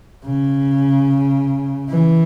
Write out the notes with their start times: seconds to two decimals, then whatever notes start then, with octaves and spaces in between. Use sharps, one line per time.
0.25 C#3
1.90 E3